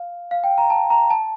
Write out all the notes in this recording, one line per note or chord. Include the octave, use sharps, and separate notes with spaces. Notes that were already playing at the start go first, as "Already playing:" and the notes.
Already playing: F5
F5
G5
A#5
A5
A#5
A5